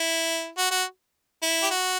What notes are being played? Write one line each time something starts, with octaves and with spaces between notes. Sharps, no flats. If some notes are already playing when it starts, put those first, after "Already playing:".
Already playing: E4
F#4
F#4
E4
G4
F#4